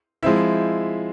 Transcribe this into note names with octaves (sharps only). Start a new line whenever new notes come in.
F3 G#3 C4 E4 E5